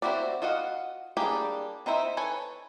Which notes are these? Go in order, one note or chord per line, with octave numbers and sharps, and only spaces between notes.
C4 E4 F#4 G4 D5
F4 F#4 D#5 F5 F#5
G3 A#3 D4 G4 G#4
C4 D#4 E4 C5 E5
A4 B4 C#5 G#5